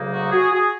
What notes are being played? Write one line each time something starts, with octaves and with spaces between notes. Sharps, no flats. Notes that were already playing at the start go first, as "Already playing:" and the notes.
Already playing: D2 C#3 F#3 A#3 D#4
F#4
F#4 G#4
F#4 G#4